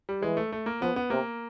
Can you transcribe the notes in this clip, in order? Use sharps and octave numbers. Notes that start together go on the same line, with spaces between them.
G3
E3 G#3
A3
A3
A#3
F3 B3
B3
C3 A#3